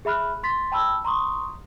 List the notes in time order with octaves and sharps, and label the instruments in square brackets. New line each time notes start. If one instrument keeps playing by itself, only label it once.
[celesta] G#4 E5 B5 F6 F#6
C6 A6 B6
G5 A5 B5 E6
A#5 C6 C#6 D#6